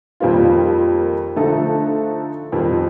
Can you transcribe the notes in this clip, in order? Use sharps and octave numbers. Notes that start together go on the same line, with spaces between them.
F2 D#3 G3 A#3 F4
D3 F3 A3 D#4 A4
F2 D#3 G3